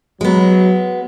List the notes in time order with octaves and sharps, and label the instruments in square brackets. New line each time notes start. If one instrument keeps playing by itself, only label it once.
[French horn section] F#3 [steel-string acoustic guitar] G#3 B3